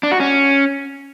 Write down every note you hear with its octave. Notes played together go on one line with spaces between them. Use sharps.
D4
F#4
C#4